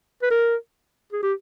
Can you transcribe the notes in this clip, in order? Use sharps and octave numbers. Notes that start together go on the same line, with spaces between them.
B4
A#4
G#4
G4